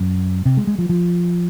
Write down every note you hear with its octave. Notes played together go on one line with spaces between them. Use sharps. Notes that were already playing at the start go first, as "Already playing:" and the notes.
Already playing: F#2
C3
G#3
G#3
F3
F3